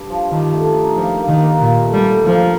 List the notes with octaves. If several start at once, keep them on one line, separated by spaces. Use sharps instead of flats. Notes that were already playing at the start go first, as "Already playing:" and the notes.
Already playing: G2
F3
G2 D#3
A3
D#4
F3 A#3
A#3
D#3
A#3
A#2 F4
A3
G3
D3
F3 A#3